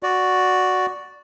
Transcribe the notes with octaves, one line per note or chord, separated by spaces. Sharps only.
F#4 D5